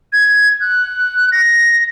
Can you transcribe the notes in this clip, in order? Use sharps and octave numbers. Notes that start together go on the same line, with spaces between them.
G#6
F#6
A#6